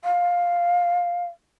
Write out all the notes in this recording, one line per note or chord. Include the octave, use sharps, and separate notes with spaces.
F5